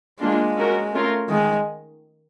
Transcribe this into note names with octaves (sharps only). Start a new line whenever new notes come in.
G#3 A#3 D4 F4
C#4 F#4 A#4
A3 C#4 F4 A#4
D#3 G#3